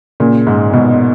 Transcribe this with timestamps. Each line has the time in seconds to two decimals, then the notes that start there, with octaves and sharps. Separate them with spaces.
0.20 A#2 C#3
0.47 G#2
0.73 G#2 B2